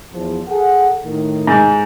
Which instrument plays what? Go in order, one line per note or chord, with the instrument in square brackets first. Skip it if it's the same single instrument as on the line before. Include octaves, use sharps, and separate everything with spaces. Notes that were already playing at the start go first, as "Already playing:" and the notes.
[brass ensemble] E2 F3
G#4 A4 F#5
A2 D#3
[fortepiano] G#2